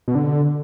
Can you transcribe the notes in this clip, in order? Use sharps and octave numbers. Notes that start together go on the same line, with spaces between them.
B2
D3